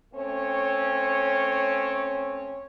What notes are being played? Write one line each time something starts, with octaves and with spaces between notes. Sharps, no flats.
A3 C4 C#4 C#5